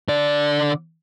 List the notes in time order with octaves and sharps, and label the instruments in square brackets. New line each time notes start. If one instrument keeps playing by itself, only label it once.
[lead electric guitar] D3 D5